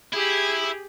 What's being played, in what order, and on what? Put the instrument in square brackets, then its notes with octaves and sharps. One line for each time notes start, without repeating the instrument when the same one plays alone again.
[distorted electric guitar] E4 [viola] G4 G#4